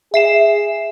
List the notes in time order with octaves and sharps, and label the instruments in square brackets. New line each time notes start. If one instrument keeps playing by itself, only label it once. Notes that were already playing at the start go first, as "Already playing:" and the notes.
[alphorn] G#4 [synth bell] E5 C7 E7